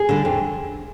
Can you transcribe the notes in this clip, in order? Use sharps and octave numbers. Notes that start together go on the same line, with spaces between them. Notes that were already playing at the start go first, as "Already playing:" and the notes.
Already playing: G#4
D3 G3
F2